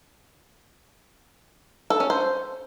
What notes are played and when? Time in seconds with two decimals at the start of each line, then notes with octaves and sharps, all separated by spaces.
1.90 A4
2.00 C#4
2.10 C5